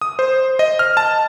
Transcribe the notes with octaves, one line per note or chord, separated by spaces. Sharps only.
D#6
C5
D#5
F6
A5